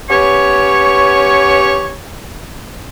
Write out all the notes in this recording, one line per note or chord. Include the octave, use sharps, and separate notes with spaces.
B3 C#4 G4 B4 C#5